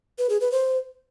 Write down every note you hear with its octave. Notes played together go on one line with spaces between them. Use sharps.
B4
G#4
B4
C5